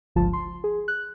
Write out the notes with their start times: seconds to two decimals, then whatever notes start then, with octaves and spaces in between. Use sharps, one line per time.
0.15 G1 C#2 F3 F4 A5
0.33 C6
0.64 G#4
0.88 F#6